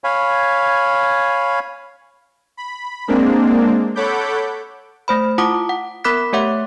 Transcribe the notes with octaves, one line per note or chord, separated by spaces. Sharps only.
C#5 F5 G#5 B5
B5
G#3 A#3 C4 D4
A4 C#5 F#5 B5 D6 G6
A3 C5 B5
E4 F4 F#5 A5 D6 D#6
F#5
B3 A#4 B5 D6 F#6 B6
A3 G4 C#5 E5 F#5 D6